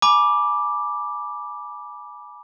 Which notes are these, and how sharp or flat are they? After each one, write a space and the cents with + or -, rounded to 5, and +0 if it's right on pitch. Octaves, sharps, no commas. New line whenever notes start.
G#5 +25 B5 -30 D6 +0